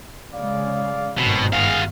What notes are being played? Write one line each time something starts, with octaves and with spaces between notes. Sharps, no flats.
C#3 G#3 D5 F5
G1 G#2 B2 D#3 F#3 C4
F#4 G#4 F5